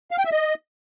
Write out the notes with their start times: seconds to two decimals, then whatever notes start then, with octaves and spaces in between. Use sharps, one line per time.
0.11 F5
0.18 G5
0.25 E5
0.32 D#5